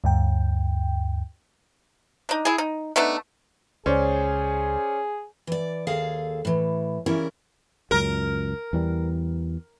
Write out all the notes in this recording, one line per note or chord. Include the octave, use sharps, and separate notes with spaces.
D2 G2 G5
D4 D#4
E4 G#4
D#4
A3 B3 D4 D#4
C#2 C#4 G#4 C5 D5
E3 D5
D#2 G#4 A4 F5
A2 E3
C#3 E3 G3 C#4 E4 A#4
C#2 F#2 A#4
E2 E3 G3